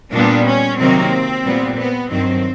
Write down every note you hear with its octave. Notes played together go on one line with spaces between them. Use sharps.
A#2 G3 B3 D4
C#4
C3 D#3 F#3 A#3 C4
A#2 G3 B3
B3
G2 D#3 F#3 C4